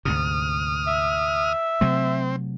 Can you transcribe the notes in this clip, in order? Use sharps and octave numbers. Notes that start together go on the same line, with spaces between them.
D2 G#2 C3 D#6 F6
E5
C3 F#3 A3 C4